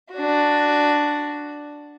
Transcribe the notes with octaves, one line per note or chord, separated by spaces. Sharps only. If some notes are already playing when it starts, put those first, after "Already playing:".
D4 F#4